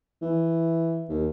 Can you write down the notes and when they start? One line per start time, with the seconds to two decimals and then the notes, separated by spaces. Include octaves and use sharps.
0.22 E3
1.09 D#2